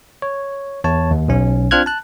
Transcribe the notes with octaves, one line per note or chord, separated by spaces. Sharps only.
C#5
E2 C#5 A5
D#2
B1 C#4
C4 D4 F4 F6 F#6 G#6
A5 F#6